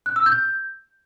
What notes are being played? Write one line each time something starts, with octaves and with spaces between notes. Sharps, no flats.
F#6
E6
G6